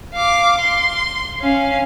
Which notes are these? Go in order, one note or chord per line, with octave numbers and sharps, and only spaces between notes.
F5 D6
C6
C#4 F5